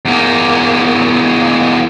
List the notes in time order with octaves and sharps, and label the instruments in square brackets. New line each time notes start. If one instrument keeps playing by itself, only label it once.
[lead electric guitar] E2 A#3